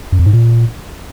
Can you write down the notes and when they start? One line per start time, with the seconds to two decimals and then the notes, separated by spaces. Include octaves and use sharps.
0.12 F#2
0.19 F2
0.26 G#2
0.33 A#2